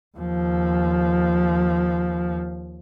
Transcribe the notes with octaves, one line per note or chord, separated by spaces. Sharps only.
D#2 F3